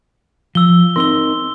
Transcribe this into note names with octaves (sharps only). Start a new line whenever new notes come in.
F3 E6 G7
C4 D#4 A#4 C6 E6 G7